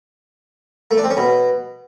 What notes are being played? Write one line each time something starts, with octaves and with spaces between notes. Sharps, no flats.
A3
D4
C4
C#4
B2